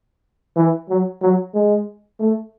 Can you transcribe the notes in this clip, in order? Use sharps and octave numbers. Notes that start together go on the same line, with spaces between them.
E3
F#3
F#3
G#3
A3